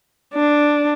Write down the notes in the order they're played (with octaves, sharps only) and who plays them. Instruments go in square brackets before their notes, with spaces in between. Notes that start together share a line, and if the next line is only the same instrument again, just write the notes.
[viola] D4